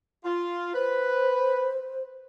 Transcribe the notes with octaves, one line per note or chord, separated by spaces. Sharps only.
F4
B4 C5